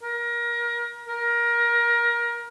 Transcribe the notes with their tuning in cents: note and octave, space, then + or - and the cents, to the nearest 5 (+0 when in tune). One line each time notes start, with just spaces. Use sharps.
A#4 +25
A#4 +20